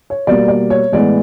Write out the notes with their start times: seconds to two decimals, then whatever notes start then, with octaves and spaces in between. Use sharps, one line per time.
0.10 C#5
0.27 B2 G3 A#3 D5
0.48 D5
0.70 C#5
0.92 A2 E3 G#3 B3 D5